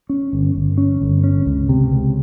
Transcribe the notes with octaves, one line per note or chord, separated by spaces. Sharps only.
C#4
G1
G1
C#4
G1
C#4
C#2
C3
C#2